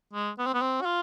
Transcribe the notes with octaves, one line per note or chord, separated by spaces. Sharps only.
G#3
B3
C4
B3
C4
F#4
F4